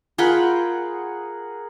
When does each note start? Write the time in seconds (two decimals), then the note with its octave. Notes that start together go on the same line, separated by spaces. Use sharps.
0.18 F4 G#4 A#4 F#5 G5 B5